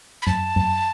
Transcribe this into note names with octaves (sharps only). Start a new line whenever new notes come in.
B5
F#2 A5
F#2